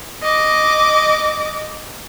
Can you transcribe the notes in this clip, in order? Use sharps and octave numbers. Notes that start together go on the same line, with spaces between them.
D#5 D6